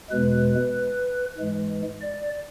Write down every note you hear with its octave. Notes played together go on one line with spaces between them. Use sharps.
E2 B2 G#3 B4
G#2 E3 G#3
D5